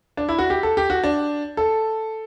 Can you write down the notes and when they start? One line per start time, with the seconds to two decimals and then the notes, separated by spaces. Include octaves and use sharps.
0.17 D4
0.29 E4
0.39 F#4
0.50 G4
0.63 A4
0.77 G4
0.90 F#4
1.04 D4
1.57 A4